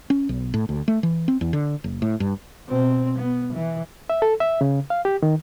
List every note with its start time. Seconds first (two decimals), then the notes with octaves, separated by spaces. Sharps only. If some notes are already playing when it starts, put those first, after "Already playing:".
0.10 C#4
0.29 B1
0.54 A2
0.69 D2
0.88 A3
1.03 E3
1.28 C4
1.41 E2
1.53 D3
1.84 F#1
2.02 A2
2.20 G2
2.67 B2 C4
3.19 B3
3.54 E3
4.10 E5
4.22 A4
4.40 E5
4.61 C#3
4.90 F5
5.05 G4
5.22 D#3